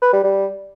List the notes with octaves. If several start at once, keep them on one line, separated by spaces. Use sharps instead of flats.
B4
G3
G3